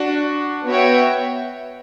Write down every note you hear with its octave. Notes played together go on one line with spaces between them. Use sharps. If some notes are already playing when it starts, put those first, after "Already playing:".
Already playing: D4 F#4
B3 F#4 C#5 E5 G5